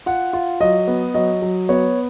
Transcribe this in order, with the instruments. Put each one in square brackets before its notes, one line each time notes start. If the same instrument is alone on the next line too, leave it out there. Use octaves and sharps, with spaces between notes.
[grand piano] F4 F#5
F4
F#3 D#5
B3
F#3 D#5
F#3
B3 C#5